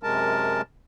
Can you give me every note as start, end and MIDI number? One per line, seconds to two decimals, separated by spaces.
0.03 0.62 42
0.03 0.62 48
0.03 0.62 56
0.03 0.62 70
0.03 0.62 81